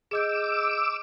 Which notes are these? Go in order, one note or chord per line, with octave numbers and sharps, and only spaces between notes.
G#4 D#5 D6 E6 G6